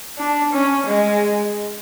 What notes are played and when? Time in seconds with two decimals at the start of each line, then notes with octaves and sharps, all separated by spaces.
0.18 D4
0.53 C#4
0.86 G#3